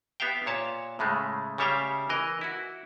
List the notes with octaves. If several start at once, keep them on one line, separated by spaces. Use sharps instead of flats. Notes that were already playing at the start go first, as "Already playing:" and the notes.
B3 G4 E5 F5 G5
A#2 C#5 A5
A2 C#3 G#3 A3
C#3 G3 C#5 E5 F5 G5
E3 A#4 D#5
E4 F#4